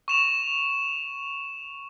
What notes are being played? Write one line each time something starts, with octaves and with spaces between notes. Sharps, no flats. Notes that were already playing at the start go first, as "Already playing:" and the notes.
C#6 E7 F7